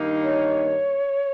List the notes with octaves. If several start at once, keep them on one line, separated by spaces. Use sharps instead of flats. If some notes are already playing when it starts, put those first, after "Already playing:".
Already playing: G2 D#3 A#3 D#4
C#5